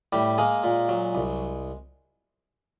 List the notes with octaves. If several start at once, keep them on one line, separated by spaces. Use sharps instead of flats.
A2 G3 G4
G#3 A#3 G#4
A#2
F#3
C2